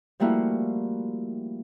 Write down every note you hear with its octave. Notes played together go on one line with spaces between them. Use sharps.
F3 G3 A3 A#3 E4 F#4